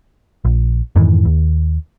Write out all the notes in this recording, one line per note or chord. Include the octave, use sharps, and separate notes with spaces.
A#1
F2 G#2 D#3 E3
D#2